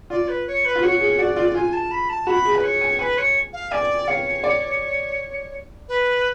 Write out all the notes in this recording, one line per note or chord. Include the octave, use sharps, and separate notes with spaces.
F4 D5
B4
C#5
B4
F4
F#4 C#5
G#4
F#4 D5
F4
F4 G#5
A5
B5
A5
F#4 B5
G#4
B4
C#5
G#5
B4 G#5
C#5
F5
D5 G#5
C#5 F5
D5
B4